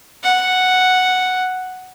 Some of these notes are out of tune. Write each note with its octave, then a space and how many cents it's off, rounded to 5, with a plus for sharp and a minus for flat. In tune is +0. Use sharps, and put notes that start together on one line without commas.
F#5 +0